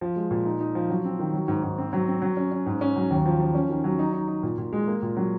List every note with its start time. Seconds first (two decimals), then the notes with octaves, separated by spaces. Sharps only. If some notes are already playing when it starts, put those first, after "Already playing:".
0.01 F3
0.16 G#3
0.31 A#2
0.45 D#4
0.61 D#4
0.75 F3
0.90 F#3
1.04 C4
1.19 D#3
1.34 F#3
1.48 G#2
1.63 G#2
1.78 C4
1.93 F#3
2.08 C4
2.22 F#3
2.37 C#4
2.52 C#4
2.66 G#2
2.81 C#4
2.96 F#3
3.11 D#2
3.26 F3
3.40 F3
3.55 C#4
3.69 D#3
3.84 F#3
3.99 D#4
4.13 D#4
4.28 D#4
4.43 A#2
4.58 A#2
4.73 G#3
4.87 A#3
5.02 A#2
5.17 F#3